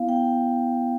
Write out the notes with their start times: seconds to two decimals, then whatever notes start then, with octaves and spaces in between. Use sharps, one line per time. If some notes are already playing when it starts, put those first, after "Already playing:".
Already playing: B3 E4 F5
0.09 G5